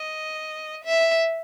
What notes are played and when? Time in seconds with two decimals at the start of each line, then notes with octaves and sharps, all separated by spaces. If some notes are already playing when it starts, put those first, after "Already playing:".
Already playing: D#5
0.85 E5